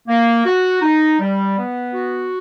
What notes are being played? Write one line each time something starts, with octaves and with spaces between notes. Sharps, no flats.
A#3
F#4
D#4
G3
B3
F#4